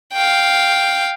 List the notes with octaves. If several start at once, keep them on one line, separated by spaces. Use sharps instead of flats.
F5 G5